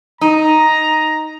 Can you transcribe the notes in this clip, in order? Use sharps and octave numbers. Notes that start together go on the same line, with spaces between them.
D#4 A#5